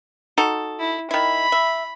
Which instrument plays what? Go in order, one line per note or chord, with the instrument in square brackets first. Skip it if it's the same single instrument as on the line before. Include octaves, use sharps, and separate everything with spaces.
[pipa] D#4 F#4 A4
[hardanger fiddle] E4
[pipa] D#3 E4 [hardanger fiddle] B5
[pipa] E5